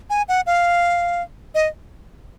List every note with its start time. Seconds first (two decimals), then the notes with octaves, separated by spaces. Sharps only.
0.10 G#5
0.29 F#5
0.46 F5
1.55 D#5